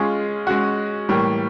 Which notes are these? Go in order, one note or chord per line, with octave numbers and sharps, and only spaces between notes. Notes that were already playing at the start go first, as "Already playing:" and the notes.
Already playing: G#3 C#4 F4 G#4
G#3 C#4 F#4
A2 E3 G3 A#3